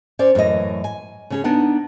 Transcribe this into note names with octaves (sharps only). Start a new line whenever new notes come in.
C#4 C5 D5
F#2 A2 E3 D#5
G#5
C#3 C#4 G#4
B3 D4 D#4 F#5